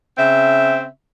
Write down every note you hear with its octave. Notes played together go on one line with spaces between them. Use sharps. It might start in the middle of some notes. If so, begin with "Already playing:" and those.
C#3 C4 E5